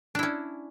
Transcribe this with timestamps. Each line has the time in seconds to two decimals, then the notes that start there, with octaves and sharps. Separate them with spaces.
0.15 D4
0.19 E4
0.23 C#4